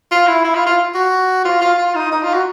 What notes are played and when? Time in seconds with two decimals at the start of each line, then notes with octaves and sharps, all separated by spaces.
0.11 F4
0.27 E4
0.44 E4
0.55 F4
0.66 F4
0.95 F#4
1.45 F4
1.61 F4
1.78 F4
1.95 D#4
2.12 D#4
2.23 F4
2.34 F#4